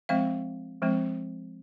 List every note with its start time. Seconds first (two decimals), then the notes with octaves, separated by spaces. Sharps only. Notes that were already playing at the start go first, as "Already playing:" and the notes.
0.09 F3 G#3 C4 F5
0.82 F3 G#3 C4